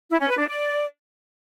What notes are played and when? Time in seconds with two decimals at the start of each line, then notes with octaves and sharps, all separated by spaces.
0.10 E4
0.20 C#4
0.29 B4
0.38 D4
0.47 D5